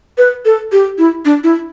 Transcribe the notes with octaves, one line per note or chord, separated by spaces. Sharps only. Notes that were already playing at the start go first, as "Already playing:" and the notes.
B4
A4
G4
E4
D4
E4